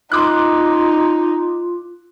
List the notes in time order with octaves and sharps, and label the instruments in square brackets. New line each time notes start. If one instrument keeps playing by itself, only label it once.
[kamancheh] D#4 [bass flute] F4 [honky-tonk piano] C6 D6 F#6